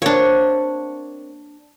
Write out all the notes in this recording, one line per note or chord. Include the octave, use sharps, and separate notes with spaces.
A#3 C4 D4 C#5